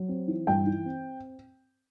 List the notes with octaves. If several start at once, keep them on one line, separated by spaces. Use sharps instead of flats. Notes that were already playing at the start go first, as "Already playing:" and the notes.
Already playing: F#3
C4
E3
G2 G5
E3
C4